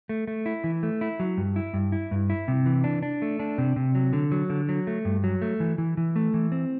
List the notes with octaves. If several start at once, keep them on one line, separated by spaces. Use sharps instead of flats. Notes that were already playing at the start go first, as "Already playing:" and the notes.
A3
A3
E4
E3
A3
E4
F#3
G2
E4
G2
E4
G2
E4
C3
E3
D4
D4
A3
D4
C3
C3
F#3
D3
F#3
D3
F#3
A3
G2
F#3
A3
E3
E3
E3
A3
E3
C4